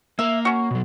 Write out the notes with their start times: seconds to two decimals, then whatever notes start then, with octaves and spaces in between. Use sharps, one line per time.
0.19 A#3 A#4 E5
0.45 C#4 F#4
0.71 B2 F#3